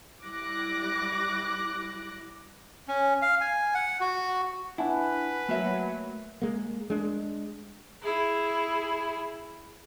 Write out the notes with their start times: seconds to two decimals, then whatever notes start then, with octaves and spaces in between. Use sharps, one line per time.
0.23 G3 E4 D6 F#6 A#6
2.88 C#4
3.22 F5
3.41 G#5
3.74 F#5
4.01 F#4
4.78 D4 E4 B4 F#5 G#5 A5
5.49 F#3 A3 A#3 E5
6.42 G#3 A#3
6.90 G#3 D4
8.03 E4 G#4